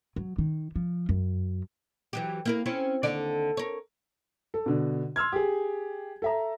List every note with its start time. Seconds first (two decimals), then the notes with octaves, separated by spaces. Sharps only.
0.16 F#3
0.38 D#3
0.76 F3
1.09 F#2
2.13 E3 F#3 G4
2.45 A#3 E4 A#4
2.66 C4 C#4 E4
3.03 D#2 D3 D5
3.57 A#4 C#5
4.54 A4
4.66 B2 D3
5.16 C6 E6 F6 G#6
5.32 G4 G#4
6.22 A4 E5 A#5